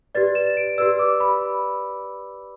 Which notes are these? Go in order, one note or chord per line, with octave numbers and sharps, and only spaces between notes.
G4 B4 D5 A6
E7
D7
G4 B4 D5 E6
D6
B5